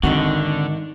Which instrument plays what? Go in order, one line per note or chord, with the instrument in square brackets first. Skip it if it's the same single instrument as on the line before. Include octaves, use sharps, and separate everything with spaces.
[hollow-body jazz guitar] G#2 D#3 F#4 [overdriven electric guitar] D3 [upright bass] C4